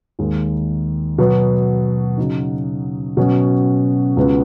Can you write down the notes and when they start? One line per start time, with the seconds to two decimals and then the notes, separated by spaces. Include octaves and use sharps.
0.19 D#2 D#3 G#3
1.18 B2 F#3 B3
2.18 C#3 F#3 D#4
3.17 B2 F#3 C#4 F#4
4.17 C#2 C#3 B3 F#4